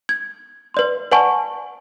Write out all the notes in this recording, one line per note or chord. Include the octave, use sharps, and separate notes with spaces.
G#6
B4 D5 C6
B4 D5 F#5 G#5 A5 C#6